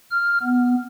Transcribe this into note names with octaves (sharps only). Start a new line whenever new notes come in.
F6
B3